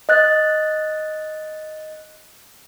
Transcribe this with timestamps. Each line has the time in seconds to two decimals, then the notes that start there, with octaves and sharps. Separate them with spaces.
0.09 D#5 F#6 A6